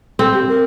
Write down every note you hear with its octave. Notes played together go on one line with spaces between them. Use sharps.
C4 A4
G4
A#4